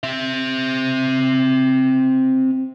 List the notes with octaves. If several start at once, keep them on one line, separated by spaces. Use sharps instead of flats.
C4 E5